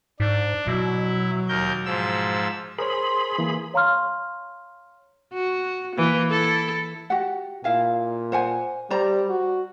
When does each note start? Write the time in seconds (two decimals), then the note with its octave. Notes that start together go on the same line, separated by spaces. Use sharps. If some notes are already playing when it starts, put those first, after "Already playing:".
0.20 G#2 D4
0.67 B2 F#3 E4
1.48 D#2 A#4 G6
1.86 G#2 F3 E6
2.79 G#4 A#4 C5 C#5 B5 C6
3.38 E3 A#3
3.74 C#5 F5 A#5 C6 C#6 F6
5.33 F#4
5.96 E3 A#3
6.31 E4 A4
7.10 F#4 G4 F#5
7.64 A#2 E4 F5 G#5
8.32 C5 F#5 G#5
8.90 G3 C5 D5 A#5
9.29 F#4